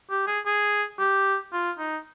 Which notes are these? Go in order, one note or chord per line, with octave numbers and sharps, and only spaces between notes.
G4
G#4
G#4
G4
F4
D#4